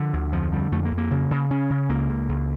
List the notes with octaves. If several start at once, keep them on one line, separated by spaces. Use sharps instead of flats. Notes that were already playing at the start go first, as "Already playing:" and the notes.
Already playing: D3 F3
D2
F2 F3
D3 G3
F2 A3
A#3
F2
A#3
C#3
C#3
C#3 C#4
C#3
C#2 A#3
C#2
C#2